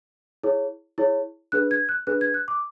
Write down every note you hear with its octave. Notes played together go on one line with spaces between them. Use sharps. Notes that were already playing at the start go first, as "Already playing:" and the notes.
E4 G#4 C#5
E4 G#4 C#5
D4 G#4 B4 F#6
G#6
F#6
D4 G#4 B4 F#6
G#6
F#6
D6